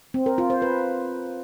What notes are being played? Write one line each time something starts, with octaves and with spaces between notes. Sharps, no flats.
C4
A#4
F4
C5
B4